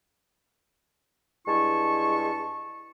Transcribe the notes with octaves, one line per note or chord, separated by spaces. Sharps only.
G2 G#3 E4 A5 C#6